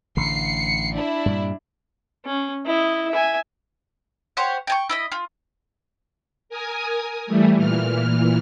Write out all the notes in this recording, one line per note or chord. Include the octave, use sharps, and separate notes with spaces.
A1 D3 C7 C#7
D4 E4
G2 A#2 G3
C#4
E4 D#5
E5 G#5
G4 C5 C#5 F#5
G5 G#5 C#6
E4 D#5 B5
F4
A#4 G#5 D#6
E3 G3 A3
A#2 E3 F6